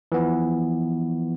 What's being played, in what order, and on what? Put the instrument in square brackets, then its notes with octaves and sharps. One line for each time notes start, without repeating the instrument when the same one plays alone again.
[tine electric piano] E3 F3 B3